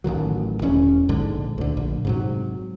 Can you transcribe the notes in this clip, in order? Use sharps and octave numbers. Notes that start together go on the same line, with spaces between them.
A1 C3 D#3 F#3
E1 E2 C#4
A#1 G#2 D3 G#3
D2 D3
A#1
G#2 C3 F#3